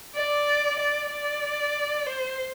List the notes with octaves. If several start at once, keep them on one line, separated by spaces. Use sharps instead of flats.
D5
D5
D5
C5